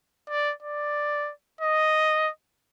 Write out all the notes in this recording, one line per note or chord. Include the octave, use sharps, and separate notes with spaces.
D5
D5
D#5